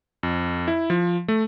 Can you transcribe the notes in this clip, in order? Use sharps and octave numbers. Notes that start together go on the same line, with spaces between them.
F2
E4
F3
A3